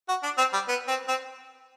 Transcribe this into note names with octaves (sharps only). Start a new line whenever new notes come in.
F#4
D4
C4
G3
B3
C4
C4